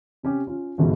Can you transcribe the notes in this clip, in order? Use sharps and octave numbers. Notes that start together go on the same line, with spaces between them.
C3 C#4 G4
C#4 F4
G1 E2 G#2 B2